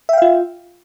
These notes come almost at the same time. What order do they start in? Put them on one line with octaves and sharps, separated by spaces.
E5 G5 F5 F4